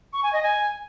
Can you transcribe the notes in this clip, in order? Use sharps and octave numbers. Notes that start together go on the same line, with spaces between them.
C#6
G#5
D#5
G#5